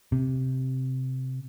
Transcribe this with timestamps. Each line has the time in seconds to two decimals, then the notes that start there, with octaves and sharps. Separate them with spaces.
0.12 C3